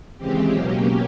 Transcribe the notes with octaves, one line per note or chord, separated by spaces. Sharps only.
D#2 C#3 E3 G#3 C4 G4
B2 F#3 A#3 C#4